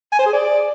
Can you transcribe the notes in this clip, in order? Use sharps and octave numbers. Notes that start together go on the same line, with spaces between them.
G#5
C5
G#4
D5